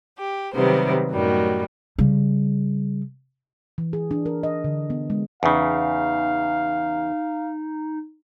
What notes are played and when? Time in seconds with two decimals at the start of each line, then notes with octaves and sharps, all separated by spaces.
0.17 G4
0.54 C3 D#3 F#3 G3 B3 C5
1.12 F#2 A2 D#3 F#3 G3
1.99 C#3 G3
3.78 E3
3.93 G#4
4.11 D4
4.26 A#4
4.43 D#5
4.64 D3
4.90 B3
5.10 G#3
5.43 E2 C#3 D#4 F5